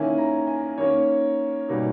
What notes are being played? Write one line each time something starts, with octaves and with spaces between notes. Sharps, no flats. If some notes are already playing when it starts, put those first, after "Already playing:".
Already playing: D#3 A#3 C#4 E4 G#5
A#5
G#5
D#3 A#3 C#4 C#5
B2 G3 A#3 D#4